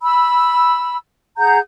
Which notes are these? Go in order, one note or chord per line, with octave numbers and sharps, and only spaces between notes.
B5 E6
G#4 F#5 A#5 G6